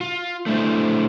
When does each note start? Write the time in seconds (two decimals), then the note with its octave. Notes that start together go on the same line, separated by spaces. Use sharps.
0.01 F4
0.46 A3 D4 E4 C5